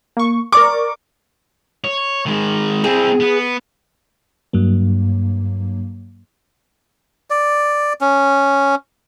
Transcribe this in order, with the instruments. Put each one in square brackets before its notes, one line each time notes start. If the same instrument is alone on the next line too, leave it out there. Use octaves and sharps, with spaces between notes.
[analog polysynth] A#3 C#6
[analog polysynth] A#4 D5 C#6 [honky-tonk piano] D6
[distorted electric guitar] C#5
D#3 G#3
[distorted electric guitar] C4 E4 [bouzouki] G#4
[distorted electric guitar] B3
[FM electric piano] G2 F#3 A#3
[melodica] D5
C#4